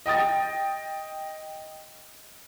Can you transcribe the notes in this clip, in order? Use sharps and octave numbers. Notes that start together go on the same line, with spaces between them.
D#5 G5 D#6 A6